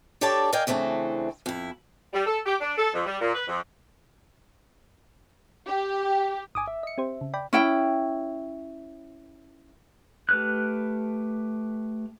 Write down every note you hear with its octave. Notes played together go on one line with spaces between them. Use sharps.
D4 G4 A4 C#5 D5 A5
A#4 D5 D#5 F5 G5 G#5
C#3 E3 A3 C4 D4
F2 E4
G3
A4
G4
D4
A4
F2
G3
A#2
B4
F2
G4
G1 G#5 D6 D#6
E5
D#5 C#7
C4 G4 C5
C#3
D5 G5 B5
C#4 E4 G5
A3 G4 B4 F6 F#6